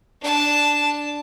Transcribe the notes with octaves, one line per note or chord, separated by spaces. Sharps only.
D4 A5